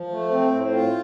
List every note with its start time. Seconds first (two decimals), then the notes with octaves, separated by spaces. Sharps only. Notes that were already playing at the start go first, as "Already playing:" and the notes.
Already playing: F3
0.11 A3
0.30 C4
0.51 A2
0.72 F4